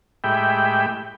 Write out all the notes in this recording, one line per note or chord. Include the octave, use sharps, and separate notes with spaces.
A2 G#3 G4 E5 G5 B5